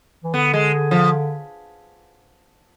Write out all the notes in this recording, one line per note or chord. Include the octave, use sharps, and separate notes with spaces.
E3
D3 B3
G#3
F3